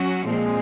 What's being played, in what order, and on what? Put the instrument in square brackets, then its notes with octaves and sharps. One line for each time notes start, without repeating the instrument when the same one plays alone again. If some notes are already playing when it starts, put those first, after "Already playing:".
Already playing: [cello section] F#3 C#4 F#4
[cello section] A#2 F3 C4 [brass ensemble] G#3